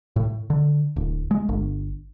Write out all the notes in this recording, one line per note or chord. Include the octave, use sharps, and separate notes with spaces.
A2
D3
D1
G#3
G1